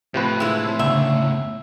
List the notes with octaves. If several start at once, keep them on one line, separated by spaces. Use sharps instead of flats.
A2 C3 F3 B4
G#3 E4 A5 E6
G1 C#3 E5